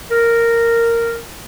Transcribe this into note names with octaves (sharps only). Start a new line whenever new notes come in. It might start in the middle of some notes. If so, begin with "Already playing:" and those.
A#4